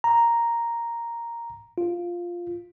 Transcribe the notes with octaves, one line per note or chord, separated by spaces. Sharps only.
A#5
F4